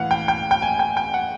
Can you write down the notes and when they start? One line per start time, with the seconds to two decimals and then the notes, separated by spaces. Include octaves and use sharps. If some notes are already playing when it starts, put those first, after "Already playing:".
Already playing: A2 E3 F5 F#5
0.11 G5
0.28 G5
0.51 G5
0.62 G#5
0.79 G5
0.97 G5
1.14 F#5